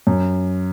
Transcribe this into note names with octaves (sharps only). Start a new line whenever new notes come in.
F#2